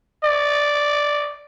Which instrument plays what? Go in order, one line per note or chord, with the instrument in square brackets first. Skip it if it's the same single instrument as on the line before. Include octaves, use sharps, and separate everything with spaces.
[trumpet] D5